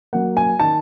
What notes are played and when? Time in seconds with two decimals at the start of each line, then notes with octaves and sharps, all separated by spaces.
0.13 F#3 A#3 F#5
0.37 G#5
0.60 D#3 A5